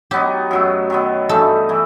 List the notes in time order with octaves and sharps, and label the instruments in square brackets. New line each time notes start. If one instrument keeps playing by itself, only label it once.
[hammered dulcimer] F#3 B3 D#4 [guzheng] G4
[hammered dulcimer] F#2 F#3 A3
D#3 F#3 B3
[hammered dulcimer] G2 E3 A3 D#4 [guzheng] A4
[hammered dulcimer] E3 A3 E4